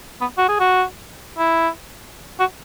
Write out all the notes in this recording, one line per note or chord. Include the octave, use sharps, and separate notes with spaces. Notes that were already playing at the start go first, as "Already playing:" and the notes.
B3
F#4
G#4
F#4
E4
F#4